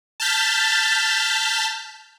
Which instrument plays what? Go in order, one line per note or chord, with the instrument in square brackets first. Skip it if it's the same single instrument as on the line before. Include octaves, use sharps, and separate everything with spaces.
[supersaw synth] A5 F6 G6 A6 B6